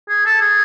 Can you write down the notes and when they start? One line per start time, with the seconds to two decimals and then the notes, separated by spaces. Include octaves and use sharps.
0.09 G#4
0.26 A4
0.42 G#4